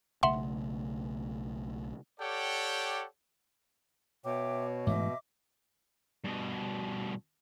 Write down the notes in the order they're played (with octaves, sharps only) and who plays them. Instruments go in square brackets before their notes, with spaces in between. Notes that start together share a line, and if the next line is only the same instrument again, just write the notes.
[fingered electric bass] B1 C#3 A3 [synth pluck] E5 F#5 C6
[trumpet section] G4 A4 C#5 D5 F#5 G5
[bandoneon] B2 [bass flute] C#5 [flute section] E5 G5 D6
[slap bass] G#2 E3 A3 [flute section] D#5 E5 D6
[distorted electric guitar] G2 B2